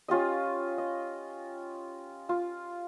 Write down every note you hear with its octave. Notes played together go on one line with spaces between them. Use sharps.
C#4 F4 G4 D#5
D#5
F4